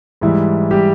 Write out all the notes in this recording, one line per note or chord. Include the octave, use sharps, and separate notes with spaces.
G#2 E3 G3 E4
G3 G4